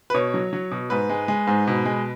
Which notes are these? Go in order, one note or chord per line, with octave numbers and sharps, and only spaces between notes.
B4
B2 C#5
F#3
F#3
B2
G#2 B4
G#3
G#3
G#2
B2
G#3